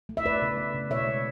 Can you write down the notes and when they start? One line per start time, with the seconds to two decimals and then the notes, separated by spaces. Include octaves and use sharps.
0.09 A3
0.17 E5
0.25 A3 B4 D5
0.42 C#3
0.57 A3
0.75 C#3
0.90 B2 C#5 E5
1.08 G#3